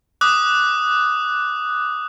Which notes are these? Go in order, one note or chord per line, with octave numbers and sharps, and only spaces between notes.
D6 D#6 F#6